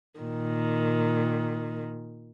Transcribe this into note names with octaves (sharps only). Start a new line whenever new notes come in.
A#2 D#3